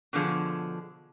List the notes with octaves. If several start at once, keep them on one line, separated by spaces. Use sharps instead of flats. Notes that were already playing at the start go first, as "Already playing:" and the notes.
B2 D3 F3 G#4